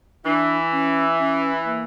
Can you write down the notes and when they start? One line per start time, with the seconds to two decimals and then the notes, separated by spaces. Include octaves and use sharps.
0.25 E3 D4
0.72 C#4
1.19 C#4
1.65 A#3